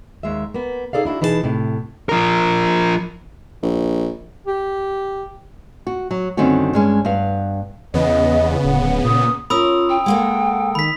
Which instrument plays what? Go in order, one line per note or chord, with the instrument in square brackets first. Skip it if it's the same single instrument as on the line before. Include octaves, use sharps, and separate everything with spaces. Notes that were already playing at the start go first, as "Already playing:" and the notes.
[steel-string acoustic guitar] D#2 G#3 E5
A#3 B3
D#4 G#4 A4 D5 F5
D4 E4 F#4
B2 E3 D#4 G#4 B4 A5
A2 C3
[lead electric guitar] F3 A#4
[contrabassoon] A#1
[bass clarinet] G4
[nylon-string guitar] F#4
F#3
G2 D3 D#3 C4 C#4 F#4
G2 G#3 C#4
G2 B3 F5
[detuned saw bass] E2 [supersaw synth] C#3 B3 [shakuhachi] D#5
[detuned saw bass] D1 [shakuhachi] F#5
[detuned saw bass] A#2 [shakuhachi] D#6
[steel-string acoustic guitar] C#4 A#4 [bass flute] F4 [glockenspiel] B5 D#6 E6
[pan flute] G5
[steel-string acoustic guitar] G#3 A#3 A4 [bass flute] F#5
[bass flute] D#3 [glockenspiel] B5 B6